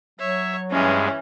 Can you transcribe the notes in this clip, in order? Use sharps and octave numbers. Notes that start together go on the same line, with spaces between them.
F#3 C#5 E5
G2 E3 G#3 C#4